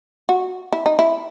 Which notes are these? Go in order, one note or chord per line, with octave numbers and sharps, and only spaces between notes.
F#4
E4
D#4
E4